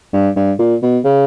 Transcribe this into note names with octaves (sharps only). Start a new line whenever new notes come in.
G2
G2
A#2
B2
C#3